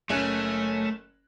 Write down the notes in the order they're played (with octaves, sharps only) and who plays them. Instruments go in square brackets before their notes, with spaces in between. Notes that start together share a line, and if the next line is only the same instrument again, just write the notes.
[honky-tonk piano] F#1 C#4 F#6 [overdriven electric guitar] A3